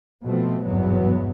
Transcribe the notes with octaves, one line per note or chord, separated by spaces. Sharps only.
B2 F3 A3 C4
G#1 E2 G2 B2 F#3 B3